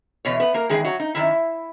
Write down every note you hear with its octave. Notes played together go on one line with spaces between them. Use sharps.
E2 B2 C#5
B3 B4
A#3 A#4
E2 D#3 G#3 G#4
F#3 F#4
D#4
F#2 D#3 E4